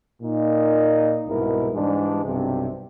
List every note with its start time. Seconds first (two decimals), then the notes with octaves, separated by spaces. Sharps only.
0.22 A#2 D#4
1.28 C2 G#2 B2 E4 A#4
1.74 G#2 E3 G3 D4
2.25 B1 G2 C3